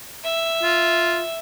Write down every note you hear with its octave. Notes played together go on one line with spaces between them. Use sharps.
E5
F4